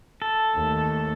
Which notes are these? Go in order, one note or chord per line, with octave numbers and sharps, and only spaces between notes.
A4
D#2 A3